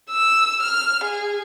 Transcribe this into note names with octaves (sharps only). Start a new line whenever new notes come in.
E6
F6
G#4